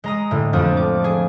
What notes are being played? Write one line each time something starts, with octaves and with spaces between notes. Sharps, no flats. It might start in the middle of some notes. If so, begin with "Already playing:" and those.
G#3 A#5 D#6
A2 D3
F2 F3 D4 D#6
D6
G#4